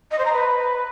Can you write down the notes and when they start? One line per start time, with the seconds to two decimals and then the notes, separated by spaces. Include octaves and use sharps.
0.11 D#5
0.18 C5
0.25 A#5
0.33 B4